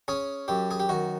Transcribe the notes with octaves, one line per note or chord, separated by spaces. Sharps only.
C#4 G#4
F#2 G4
G#4
G4
D#3 F#4